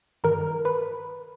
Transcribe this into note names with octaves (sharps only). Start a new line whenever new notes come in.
G2 D#3 A#4 A#5
B4 B5